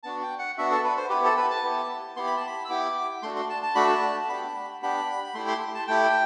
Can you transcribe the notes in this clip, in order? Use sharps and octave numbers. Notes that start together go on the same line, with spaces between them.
B3 D4 F#4 A5
G5
F#5
B3 D4 F#4 E5
A4
B4
C5
B3 E4 G4 B4
A4
B4
A5
B3 E4 G4
B3 E4 G4 C6
B5
A5
B5
E6
B3 E4 G4 D6
A3 D4 F#4 C6
C6
A5
A5
A3 D4 F#4 B5
A5
B3 D4 G4 B5
B3 D4 G4 B5
B5
A3 E4 G4 C6
C6
A5
A3 E4 G4 G5